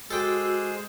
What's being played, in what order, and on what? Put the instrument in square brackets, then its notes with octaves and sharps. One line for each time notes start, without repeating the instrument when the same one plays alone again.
[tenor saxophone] G#3 [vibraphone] F#4 D6 E6 [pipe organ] G#4 C5 [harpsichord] A4 G5